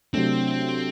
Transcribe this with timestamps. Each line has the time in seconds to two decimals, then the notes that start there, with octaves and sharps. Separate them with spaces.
0.14 C3 F#3 A3 C4 D4